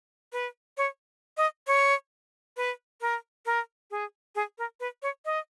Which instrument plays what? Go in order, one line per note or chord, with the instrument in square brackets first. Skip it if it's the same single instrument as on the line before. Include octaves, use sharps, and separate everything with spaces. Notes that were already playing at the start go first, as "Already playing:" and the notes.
[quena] B4
C#5
D#5
C#5
B4
A#4
A#4
G#4
G#4
A#4
B4
C#5
D#5